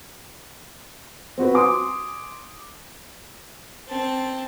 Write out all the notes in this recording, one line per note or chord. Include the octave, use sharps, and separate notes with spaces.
C4 F#4 B4
G#5 C6 D6 D#6
C4 A5